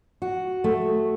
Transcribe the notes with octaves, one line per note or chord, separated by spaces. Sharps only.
F#4
A3